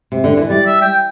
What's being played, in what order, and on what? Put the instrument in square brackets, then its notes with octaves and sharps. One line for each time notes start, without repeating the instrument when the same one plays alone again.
[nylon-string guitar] C3
D3
E3
[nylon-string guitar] G3 [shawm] D5
[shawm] E5
G5